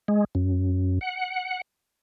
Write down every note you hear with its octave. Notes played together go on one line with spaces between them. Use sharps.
G#3
F#2
F#5